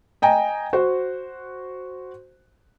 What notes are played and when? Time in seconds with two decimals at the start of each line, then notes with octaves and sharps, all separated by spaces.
0.22 D#5 G5 G#5 A#5
0.73 F#4 C5